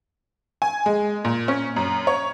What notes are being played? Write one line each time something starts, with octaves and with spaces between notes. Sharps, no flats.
G#5
G#3
A#2
C#4
F#2
C#5